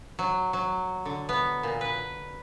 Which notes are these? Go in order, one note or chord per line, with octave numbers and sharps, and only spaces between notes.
F#3
F#3
D3
B3
A#2
B4